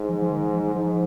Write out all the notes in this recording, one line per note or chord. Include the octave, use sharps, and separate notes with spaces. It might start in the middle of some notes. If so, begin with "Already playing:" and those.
Already playing: G#2
F3
F3
D#3
F3
G#2 F3